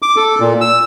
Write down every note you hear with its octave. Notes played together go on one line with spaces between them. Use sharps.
D6
A4
A#2
E6